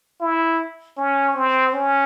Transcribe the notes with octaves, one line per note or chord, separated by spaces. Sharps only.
E4
C#4
C4
C#4